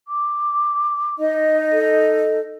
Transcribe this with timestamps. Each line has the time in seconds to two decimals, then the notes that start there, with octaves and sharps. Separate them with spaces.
0.08 D6
1.19 D#4 D#5
1.72 A4